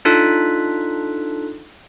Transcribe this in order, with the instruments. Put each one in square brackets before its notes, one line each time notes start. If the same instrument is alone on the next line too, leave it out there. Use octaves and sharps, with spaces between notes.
[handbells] D4 D#4 F4 A4 F#6 B6